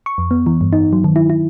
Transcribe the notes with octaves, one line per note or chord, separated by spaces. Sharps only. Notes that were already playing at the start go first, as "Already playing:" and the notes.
C#6
F2
B3
E3
G2
D#4
F#3
D#3
E4
E4